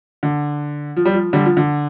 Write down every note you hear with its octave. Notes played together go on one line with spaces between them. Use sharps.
D3
F3
G3
F3
D3 G3
F3
D3